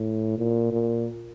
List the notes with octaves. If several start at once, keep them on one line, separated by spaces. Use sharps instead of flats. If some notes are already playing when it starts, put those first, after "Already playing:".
Already playing: A2
A#2
A#2